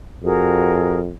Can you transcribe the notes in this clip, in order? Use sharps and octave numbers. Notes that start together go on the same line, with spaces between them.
F2 F#4 G#4 A#4